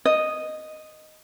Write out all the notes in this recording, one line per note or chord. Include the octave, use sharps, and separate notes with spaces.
D#5